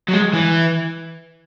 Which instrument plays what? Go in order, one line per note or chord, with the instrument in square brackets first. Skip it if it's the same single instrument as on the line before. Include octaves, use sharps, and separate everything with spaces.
[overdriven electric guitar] F#3
G#3
E3